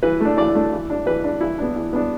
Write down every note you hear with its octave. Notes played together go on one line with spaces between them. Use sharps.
E3 B4
A3 D4
E3 D5
A3 D4
E3
D4
E3 B4
D4
E3 E4
B3 D4
E3
B3 D4